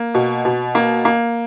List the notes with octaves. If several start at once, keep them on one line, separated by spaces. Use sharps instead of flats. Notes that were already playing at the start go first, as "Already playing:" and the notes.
Already playing: A#3
B2
B2
A#3
A#3